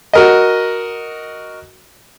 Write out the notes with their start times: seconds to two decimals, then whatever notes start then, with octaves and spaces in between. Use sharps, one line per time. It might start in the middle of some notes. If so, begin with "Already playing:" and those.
0.13 F#4 A#4 D#5